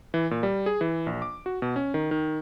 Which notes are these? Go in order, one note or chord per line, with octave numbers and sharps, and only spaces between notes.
E3
A#2
G3
G#4
E3
A#1
D6
F#4
B2
C#4
D#3
D#3